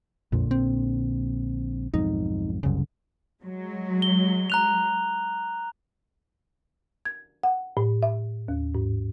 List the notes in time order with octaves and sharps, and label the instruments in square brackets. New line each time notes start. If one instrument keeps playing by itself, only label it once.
[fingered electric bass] A#1 A#2 D3 [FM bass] F2
[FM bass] C4
[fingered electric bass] B1 F2 G#2 [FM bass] D#4
[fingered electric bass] F#1 C2 F#2 [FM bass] C#3
[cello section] F#3 G#3
[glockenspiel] G7
A#5 F#6 F7
[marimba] G#6
F#5
A2
E5
D#2
G#2